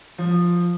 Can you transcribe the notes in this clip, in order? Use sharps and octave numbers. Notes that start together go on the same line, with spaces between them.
F3